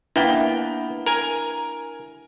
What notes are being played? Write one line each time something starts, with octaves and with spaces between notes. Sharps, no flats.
A#3 B3 D4 E4 E5 G5
A#4 G#5